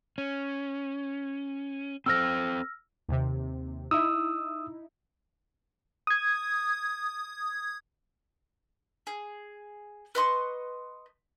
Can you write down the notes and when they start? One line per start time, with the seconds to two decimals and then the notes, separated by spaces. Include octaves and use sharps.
0.18 C#4
2.06 C4 A4 C5 E6 F6 A#6
3.09 D#2 C3
3.91 D#4 E4 D#6 E6
6.07 D#6 G#6
9.07 G#4
10.15 B4 D#5 C6 C#6